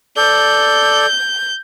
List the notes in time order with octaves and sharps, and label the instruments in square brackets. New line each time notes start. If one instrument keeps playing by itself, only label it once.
[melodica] A4 D5 [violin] G6